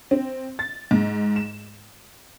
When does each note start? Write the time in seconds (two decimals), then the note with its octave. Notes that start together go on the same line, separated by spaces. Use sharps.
0.11 C4
0.59 A6
0.91 G#2
1.36 E7